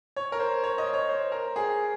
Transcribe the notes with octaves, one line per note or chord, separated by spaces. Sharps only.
C#5
A#4
C5
C#5
D#5
C#5
C5
A#4
G#4